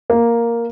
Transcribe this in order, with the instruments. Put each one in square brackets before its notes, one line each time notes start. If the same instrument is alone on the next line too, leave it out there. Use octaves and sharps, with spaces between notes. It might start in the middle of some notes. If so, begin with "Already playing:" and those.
[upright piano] A#3